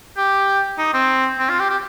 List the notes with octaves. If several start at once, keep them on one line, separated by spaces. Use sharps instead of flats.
G4
D#4
C4
C4
F4
G4
G4